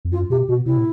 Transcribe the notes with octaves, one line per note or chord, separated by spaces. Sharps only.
F2
F#2 F4
B2 G4
B2 F#4
C3 E4
A#2